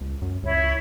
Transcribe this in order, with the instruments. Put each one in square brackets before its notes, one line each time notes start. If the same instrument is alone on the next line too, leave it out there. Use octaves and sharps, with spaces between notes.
[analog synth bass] C#2
F#2
[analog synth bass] C#2 [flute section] E4 C#5